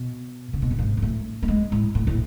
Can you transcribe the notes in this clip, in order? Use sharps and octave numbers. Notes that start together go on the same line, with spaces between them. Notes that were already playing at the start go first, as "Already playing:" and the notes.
Already playing: B2
C#3
B2
A2
G#2
G#2
A2
A3
G#3
A2
A2
A2